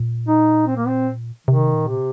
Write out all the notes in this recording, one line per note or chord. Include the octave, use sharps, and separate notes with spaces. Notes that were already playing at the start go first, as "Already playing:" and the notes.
Already playing: A#2
D#4
C4
A#3
C4
C3 D#3
A#2
C3